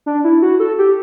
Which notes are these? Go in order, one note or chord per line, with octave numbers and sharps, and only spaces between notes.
D4
E4
F#4
A4
G4